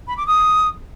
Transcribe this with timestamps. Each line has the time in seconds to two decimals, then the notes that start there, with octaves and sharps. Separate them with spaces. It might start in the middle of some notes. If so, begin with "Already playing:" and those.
0.07 B5
0.17 D6
0.27 D#6